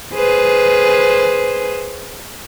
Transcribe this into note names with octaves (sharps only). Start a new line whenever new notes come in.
G#4 B4 C5